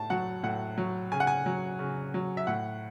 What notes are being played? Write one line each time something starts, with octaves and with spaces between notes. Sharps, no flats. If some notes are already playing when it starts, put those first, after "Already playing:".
Already playing: A2 A5
F#3 F#5
A2 F#5
F#3
C#3 G#5
F#5
G#5
F#3
C#3
F#3
E5
A2 F#5